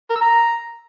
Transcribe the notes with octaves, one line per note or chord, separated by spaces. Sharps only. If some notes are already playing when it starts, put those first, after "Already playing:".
A#4
E6
A#5